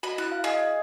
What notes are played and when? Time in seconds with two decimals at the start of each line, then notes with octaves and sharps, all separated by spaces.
0.03 F#4 D#5 B5
0.18 E4 F#6
0.32 F5
0.44 G#4 D#5